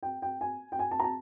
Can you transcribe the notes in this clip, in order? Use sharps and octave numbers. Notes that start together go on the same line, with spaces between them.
G5
G5
G#5
G5
G#5
A5
A#5
A5